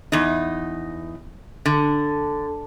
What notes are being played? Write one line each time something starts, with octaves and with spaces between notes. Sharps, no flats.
E2 D#4
D3